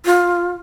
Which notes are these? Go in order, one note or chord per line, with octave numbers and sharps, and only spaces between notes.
F4